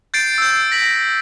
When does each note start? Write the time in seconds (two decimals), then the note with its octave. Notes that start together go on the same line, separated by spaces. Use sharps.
0.14 G6 A6 C7 D7
0.38 E6 G6
0.72 A#6 B6 F#7